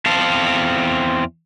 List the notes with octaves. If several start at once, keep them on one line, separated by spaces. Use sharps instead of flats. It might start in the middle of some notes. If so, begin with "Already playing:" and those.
E2 C4 F5 A5